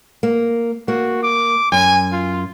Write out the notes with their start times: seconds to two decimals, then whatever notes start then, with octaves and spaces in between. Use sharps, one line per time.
0.23 A#3
0.88 A#3 F#4
1.23 D6
1.72 F#2 G#5
2.12 F4